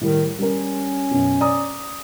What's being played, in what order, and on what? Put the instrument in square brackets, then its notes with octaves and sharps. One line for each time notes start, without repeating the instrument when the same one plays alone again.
[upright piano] A2 G3 [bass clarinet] D#3
[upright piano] G3 A#4 [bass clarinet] C#4
[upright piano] F#2 B2
D5 A#5 D#6